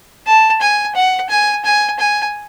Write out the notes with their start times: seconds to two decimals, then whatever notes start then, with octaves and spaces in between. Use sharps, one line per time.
0.26 A5
0.61 G#5
0.95 F#5
1.30 G#5
1.65 G#5
1.99 G#5